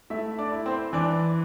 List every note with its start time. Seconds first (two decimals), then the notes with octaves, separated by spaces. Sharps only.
0.10 A3 E4 E5
0.38 D4 D5
0.52 E4
0.66 C4 C5
0.93 E3 D4 D5